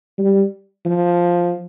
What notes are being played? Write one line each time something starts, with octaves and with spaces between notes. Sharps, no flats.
G3
F3